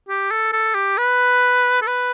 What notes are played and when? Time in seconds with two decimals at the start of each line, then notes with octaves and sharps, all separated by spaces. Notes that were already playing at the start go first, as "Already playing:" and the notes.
0.09 G4
0.31 A4
0.53 A4
0.75 G4
0.98 B4
1.82 A4
1.87 B4